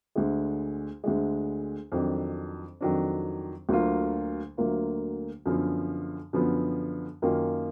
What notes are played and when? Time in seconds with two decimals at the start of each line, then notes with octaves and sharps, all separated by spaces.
0.16 D2 D3 G#3
1.04 D2 D3 G#3
1.92 F2 D#3 F#3 D4
2.81 F2 D#3 F#3 D4
3.69 D2 D3 F#3 A#3 F4
4.57 D2 D3 F#3 A#3 F4
5.46 F#2 D3 F3 B3
6.33 F#2 D3 F3 B3
7.22 F#2 D#3 A#3 F4